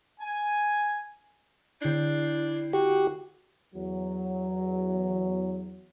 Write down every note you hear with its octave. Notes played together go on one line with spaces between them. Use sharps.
G#5
D3 D4 E4 G6 C7
F#4 G4
E2 F#3